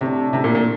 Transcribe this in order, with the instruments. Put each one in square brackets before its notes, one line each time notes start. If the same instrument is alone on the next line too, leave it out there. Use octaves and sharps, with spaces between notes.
[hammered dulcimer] A2 A3 D4 [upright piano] C3
[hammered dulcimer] A2 A3 D4 [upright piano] C3
[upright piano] A#2
A#2